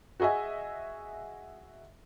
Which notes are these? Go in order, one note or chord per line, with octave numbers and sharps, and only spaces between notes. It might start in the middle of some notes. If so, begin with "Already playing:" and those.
F#4 G#4 D#5 E5 G#5